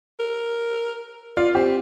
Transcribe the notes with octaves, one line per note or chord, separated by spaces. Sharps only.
A#4
F4 D5
C4 G4